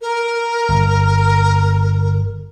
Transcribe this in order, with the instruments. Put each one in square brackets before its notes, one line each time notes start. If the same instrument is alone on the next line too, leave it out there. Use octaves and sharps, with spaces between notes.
[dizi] A#4
[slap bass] G1